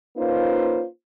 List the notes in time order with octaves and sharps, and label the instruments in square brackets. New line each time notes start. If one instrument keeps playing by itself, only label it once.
[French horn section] A#3 C#4 D#4 F4 B4 C5